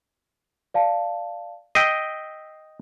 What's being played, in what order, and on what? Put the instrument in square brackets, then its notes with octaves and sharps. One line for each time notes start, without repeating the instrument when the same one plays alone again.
[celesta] D5 F5 A5
[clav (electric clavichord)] D#5 G5 [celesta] E6 B6 C7